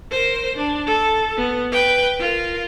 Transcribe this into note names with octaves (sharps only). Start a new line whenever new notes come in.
A#4 C5
D4
A4
B3
B4 G5
F4 A#4